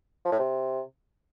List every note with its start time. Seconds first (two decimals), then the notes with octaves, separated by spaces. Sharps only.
0.25 F3
0.32 A2
0.39 C3